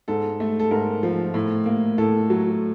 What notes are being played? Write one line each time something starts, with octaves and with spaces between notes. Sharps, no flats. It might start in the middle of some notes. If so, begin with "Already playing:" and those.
G#2 A4
A3
A4
G#2 A#4
F3
A2
A#3
A2 A4
F#3